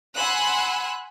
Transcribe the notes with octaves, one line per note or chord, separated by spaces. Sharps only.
F#5 G#5 B5 C6 E6 F#6